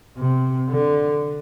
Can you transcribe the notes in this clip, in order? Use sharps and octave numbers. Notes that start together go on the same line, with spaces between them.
C3
D3